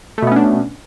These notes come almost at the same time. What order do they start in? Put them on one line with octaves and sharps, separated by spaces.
A3 B2 B3 C#4 D4